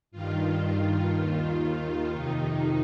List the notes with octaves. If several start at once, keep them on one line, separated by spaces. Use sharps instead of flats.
G2 D#3 F4
D#2 D#3 F4
F2 C3 D#3 D#4